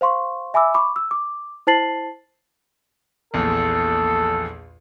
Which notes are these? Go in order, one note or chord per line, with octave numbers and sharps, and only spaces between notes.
C5 F5 C6 C#6
E5 G#5 B5 D6 E6
B5 C#6 D6
E6
D6
E4 C5 A5 A6 C7 F#7
A#1 E2 A4